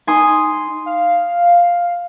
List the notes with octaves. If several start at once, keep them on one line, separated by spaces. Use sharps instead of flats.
D#4 G#5 C6 D#6
F5